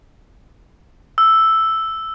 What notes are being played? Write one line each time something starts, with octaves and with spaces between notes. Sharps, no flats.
E6